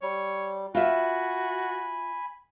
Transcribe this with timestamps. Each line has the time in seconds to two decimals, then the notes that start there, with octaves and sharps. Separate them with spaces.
0.02 G3 C#5
0.75 F4 F#4 E5 G#5 B5